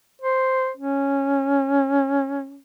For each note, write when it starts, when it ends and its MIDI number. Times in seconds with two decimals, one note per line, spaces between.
0.22 0.70 72
0.77 2.59 61